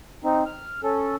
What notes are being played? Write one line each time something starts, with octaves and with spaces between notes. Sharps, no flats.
C4 D#4
F6
C#4 A4